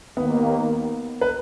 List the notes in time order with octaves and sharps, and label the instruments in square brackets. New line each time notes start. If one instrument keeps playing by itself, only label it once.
[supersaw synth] D#2 D#3 A#3 [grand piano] B3
[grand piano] B4